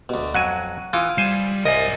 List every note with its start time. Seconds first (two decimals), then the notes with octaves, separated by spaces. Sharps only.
0.09 D2 B2
0.34 F2 F#3 F#5 G#5
0.93 E3 F4 D#6
1.18 G3 C5 G#5
1.65 C2 A#4 D#5 G#5